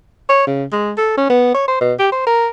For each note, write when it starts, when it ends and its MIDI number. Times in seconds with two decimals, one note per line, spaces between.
0.29 0.44 73
0.47 0.64 49
0.72 0.92 56
0.98 1.14 69
1.18 1.30 61
1.30 1.52 59
1.54 1.66 73
1.68 1.77 72
1.81 1.94 47
1.99 2.10 67
2.12 2.23 72
2.27 2.48 70